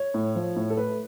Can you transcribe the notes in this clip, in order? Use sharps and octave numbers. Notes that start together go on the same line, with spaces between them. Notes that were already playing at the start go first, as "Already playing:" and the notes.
Already playing: C#5
A2
F3
A2
A4
A3 B4